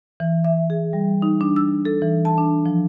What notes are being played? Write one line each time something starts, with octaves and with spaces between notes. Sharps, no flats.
E3
E5
G#4
G3
D#4
D4
E6
A4
E3
A5
D4
F3